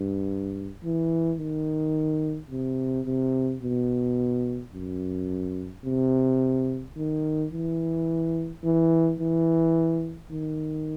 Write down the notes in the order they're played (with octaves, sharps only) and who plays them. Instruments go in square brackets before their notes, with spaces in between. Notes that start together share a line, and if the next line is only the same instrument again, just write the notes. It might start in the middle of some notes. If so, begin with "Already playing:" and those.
Already playing: [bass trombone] G2
E3
D#3
C3
C3
B2
F#2
C3
D#3
E3
E3
E3
D#3